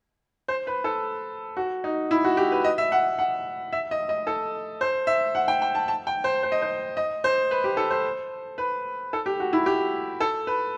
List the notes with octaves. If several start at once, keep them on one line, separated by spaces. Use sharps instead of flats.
C5
B4
A4
F#4
D#4
E4
F#4
G4
B4
D#5
E5
F#5
F#5
E5
D#5
D#5
A4
C5
E5
F#5
G5
G5
A5
A5
G5
C5
C5
D#5
C5
D#5
C5
B4
G4
A4
C5
B4
A4
G4
F#4
E4
G4
A4
B4